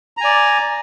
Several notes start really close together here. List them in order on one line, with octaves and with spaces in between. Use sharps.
A#5 G#5 D5